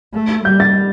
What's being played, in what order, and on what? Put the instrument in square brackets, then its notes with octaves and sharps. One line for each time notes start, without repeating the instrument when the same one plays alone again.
[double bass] A3
[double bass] G3 [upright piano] G6
[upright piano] A6